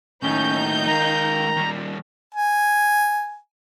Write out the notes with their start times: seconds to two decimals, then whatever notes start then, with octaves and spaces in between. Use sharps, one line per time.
0.23 D#2 A2 C#4 D#4 G6
0.87 D#3 G#3 F5 A#5
1.56 D#2 G3
2.35 G#5